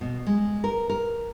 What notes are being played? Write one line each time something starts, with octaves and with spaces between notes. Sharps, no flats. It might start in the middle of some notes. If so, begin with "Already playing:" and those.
B2
G#3
A#4
A#4